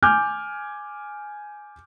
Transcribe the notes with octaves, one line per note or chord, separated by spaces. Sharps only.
G#5 D6 F6 G6